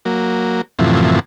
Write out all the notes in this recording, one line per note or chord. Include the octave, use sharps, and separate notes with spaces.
F#3 A#3
F#2 A2 C3 E3 F3